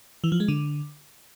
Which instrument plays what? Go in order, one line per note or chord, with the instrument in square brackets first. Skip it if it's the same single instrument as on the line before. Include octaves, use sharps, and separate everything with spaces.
[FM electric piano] E3
F3
G#3
D3